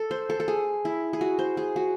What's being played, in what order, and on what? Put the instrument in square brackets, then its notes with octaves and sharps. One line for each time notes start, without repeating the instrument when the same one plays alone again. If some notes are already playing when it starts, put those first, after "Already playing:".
Already playing: [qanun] A4
C5
A4
A4
G#4
E4
G#4
F#4
C5
G#4
F#4